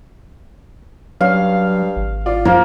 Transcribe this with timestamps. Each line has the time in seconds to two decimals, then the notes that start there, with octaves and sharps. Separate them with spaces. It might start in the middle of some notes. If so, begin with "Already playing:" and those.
1.21 G2 F#3 C#4 F5
1.96 G#1
2.26 F4 D5
2.45 F#2 F3 A#3